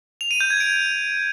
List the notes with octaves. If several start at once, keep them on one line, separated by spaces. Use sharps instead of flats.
F7
D#7
G6
G#6
D7